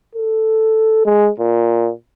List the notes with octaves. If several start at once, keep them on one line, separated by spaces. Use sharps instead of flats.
A4
G#3
A#2